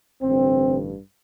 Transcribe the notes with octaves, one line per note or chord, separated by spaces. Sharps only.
A1 G2 D3 C4